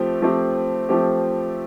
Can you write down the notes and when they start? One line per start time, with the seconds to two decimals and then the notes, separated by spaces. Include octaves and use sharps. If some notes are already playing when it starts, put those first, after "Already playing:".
Already playing: F3 A3 C4 G4
0.22 F3 A3 C4 G4
0.89 F3 A3 C4 G4